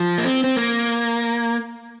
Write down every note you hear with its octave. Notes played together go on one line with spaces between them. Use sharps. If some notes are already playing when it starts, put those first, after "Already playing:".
Already playing: F3
A#3
C4
C4
A#3